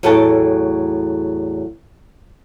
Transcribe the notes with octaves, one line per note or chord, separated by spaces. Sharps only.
E2 A2 F#3 A4 G5 A5